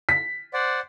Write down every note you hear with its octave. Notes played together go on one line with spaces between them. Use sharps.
B6
C5 D5 F#5